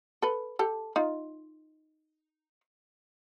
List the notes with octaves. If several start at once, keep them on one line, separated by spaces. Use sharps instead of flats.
A4 B4
G4 A4
D#4 F4